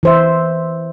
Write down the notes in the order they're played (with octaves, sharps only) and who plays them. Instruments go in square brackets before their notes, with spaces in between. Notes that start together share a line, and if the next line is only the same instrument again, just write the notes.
[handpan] E3 C5 E5